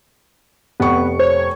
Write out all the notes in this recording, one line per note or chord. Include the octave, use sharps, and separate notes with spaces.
F1 B3 C#6
C5 C#5